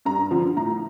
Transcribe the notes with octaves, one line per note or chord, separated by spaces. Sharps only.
G2 A#5
D3 F3
A2 A#5